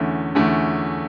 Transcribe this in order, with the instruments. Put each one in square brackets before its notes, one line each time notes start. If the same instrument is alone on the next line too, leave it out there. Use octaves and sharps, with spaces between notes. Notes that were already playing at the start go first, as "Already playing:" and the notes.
Already playing: [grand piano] E2 D3 A3 C#4
E2 D3 A3 C#4